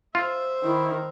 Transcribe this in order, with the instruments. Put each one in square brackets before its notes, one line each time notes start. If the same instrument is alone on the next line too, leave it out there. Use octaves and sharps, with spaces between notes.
[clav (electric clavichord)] F4 [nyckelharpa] C5 E5
[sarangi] D#3 [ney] E4